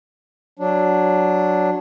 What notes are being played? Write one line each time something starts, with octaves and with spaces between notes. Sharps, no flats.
F#3 D4